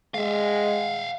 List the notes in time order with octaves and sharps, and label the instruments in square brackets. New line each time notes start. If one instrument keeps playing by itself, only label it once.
[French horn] G#3 [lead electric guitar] E5 F5